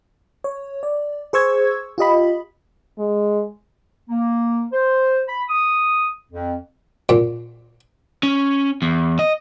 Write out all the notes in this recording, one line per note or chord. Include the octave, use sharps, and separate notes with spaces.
C#5
D5
G#4 C5 C#6 E6 G#6
F4 G4 D#5 B5
G#3
A#3
C5
B5
D#6
F2
A#2
C#4
E2
D#5